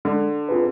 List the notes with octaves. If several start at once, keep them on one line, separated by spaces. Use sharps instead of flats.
D3 G#3
C4 F4 G#4 B4